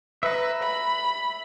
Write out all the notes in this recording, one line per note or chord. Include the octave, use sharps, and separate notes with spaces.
B4 E5 A#5
B5